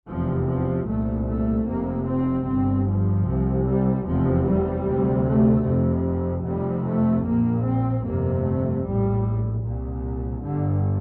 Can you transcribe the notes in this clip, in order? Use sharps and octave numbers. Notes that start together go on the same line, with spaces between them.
F1 E2 C3 F3
F3
C2 A#2 A3
A3
F1 F2 C3 A#3
C4
G1 G2 C4
F3
C2 C3
G3
F1 E2 C3 F3
G3
D2 C3
A3
F1 F2 C3
F1 F2 C3 G3
A3
A#1 A#2 A#3
C4
G1 F2 C3 A#3
A3
A#1 A2 G3
C2 A#2
G1 G2 D3